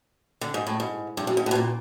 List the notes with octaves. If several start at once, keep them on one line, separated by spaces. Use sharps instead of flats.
D3
G#2
A2
G#2
G2
F#2
G#2
A2
B2
A#2